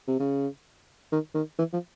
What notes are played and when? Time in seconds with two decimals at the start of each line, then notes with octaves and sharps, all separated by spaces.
0.08 C3
0.19 C#3
1.12 D#3
1.35 D#3
1.58 E3
1.73 F3